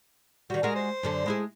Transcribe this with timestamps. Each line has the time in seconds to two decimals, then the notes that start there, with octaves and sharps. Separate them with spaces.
0.50 D#3 G3 F#4
0.63 G#3 F#4 A#4
0.76 C5
1.03 F#2 D3 A4
1.26 G#3 E4 G#4